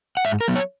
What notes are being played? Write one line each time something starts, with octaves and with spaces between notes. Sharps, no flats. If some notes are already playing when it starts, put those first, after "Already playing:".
F#5
G#2 E5
A#4
F#3 B3
C#5